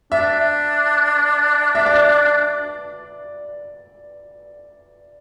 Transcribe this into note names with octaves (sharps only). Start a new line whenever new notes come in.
D4 E5
E5
D5